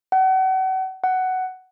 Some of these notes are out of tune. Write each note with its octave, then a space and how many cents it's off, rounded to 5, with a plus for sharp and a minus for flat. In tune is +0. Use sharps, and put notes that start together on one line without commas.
F#5 +35
F#5 +10